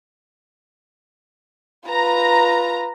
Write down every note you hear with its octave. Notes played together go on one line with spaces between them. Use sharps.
F4 B4 A#5